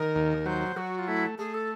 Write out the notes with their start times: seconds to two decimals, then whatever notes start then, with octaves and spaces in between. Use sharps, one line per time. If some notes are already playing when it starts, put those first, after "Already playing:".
Already playing: D#3 A#4
0.15 D#2
0.46 F#3 C5
0.76 F#3 F#4
0.99 F4
1.08 A3 E4
1.38 A3 G#4
1.54 A4